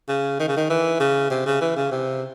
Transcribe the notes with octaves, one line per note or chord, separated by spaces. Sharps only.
C#3
D#3
C#3
D#3
E3
C#3
C3
C#3
E3
C#3
C3